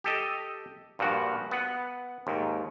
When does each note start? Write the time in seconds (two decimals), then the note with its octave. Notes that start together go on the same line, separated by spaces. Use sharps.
0.04 G4 A4 D#5
0.99 G2 A#2 F3 F#4
1.51 B3 F#5
2.27 D#2 G#2